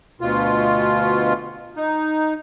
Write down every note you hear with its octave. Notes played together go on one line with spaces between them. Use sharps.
D2 B2 F4
D#4